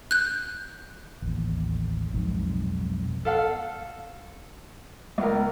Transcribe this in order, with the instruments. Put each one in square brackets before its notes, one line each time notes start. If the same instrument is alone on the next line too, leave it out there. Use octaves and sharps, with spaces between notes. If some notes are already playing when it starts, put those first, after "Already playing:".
[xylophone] F#6 G6
[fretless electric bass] A1 D#2
B1 F2 G#2
[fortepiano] A4 F5 F#5
C#2 A#4